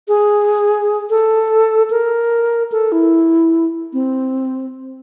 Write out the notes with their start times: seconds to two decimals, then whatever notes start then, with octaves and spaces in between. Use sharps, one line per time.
0.08 G#4
1.10 A4
1.90 A#4
2.72 A4
2.92 E4
3.93 C4